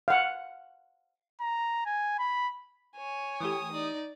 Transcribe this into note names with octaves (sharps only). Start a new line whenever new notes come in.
F5 F#5
A#5
G#5
B5
C#5 G#5
E3 A3 G4 D#6
D#4 D5